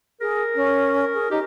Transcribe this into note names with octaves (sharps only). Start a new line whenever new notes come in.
G#4 A#4
C#4
G#4
D#4 G4